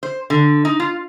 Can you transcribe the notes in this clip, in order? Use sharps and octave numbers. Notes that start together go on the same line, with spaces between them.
C5
D3
D#4
F4